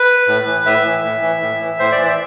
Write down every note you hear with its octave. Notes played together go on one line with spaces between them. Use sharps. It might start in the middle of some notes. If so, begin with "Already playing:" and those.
Already playing: B4
A2
E3
A2 E5
E3
A2
E3
A2
E3
A2 C5
D5
E3
E5